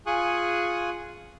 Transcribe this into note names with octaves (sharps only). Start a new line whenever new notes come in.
F4 G#4 G#5 C#6 D#6 F#6